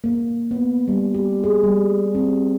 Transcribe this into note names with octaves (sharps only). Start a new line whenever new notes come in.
A#3
B3
G3
G4
G#4
G3
C4